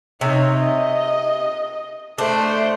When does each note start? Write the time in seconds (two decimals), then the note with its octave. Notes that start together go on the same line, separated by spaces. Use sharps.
0.21 C3 D#4 C#5
0.59 D#5
2.18 A3 D4 C5